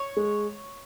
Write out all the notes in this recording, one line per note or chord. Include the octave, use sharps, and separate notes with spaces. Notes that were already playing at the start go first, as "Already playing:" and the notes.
Already playing: C#5
G#3